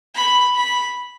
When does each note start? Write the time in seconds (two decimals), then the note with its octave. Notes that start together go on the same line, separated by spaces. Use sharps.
0.15 B5
0.56 B5